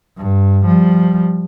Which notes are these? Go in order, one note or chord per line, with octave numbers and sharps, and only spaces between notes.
G2
F3 G3